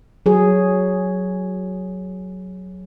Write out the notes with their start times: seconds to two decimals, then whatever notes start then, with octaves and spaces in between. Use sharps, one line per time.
0.26 F#3 G#4